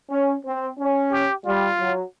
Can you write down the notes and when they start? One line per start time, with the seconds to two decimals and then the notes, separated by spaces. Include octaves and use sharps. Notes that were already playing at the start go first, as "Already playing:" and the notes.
0.10 C#4
0.45 C4
0.78 C#4
1.11 G4
1.45 G3 F4
1.79 F#3